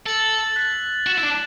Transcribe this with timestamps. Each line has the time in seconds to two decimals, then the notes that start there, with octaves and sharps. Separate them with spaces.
0.06 A4 E6 A6 F#7
0.56 F#6 B6 F#7
1.07 F#4 A6 E7
1.18 E4
1.23 D4